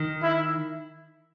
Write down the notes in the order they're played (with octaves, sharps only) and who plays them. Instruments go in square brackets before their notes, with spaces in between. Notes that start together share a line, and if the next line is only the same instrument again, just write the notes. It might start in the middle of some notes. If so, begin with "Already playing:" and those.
Already playing: [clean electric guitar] D#3
[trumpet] E4